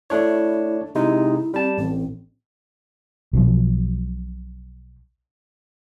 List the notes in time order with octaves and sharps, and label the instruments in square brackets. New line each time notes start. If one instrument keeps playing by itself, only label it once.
[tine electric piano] A3 D4 C#5 [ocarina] E4
[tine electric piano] C3 G#3 D#4 [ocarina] E4
[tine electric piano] G3 A5 [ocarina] C4
[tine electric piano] A1 [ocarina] C4
[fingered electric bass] B1 B2 F3